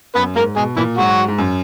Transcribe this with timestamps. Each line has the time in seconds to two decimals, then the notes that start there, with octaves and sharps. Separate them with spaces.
0.15 F#2 B3 B4
0.36 G#2 A#3 A#4
0.56 B2 G#3 G#4
0.76 A#2 E3 E4
0.98 G#2 F#3 F#4
1.28 G#2
1.38 F#2